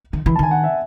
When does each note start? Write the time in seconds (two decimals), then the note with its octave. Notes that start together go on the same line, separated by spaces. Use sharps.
0.13 D#3
0.26 E3 B5
0.36 A5
0.39 D#3 G#5
0.51 F#5
0.64 E5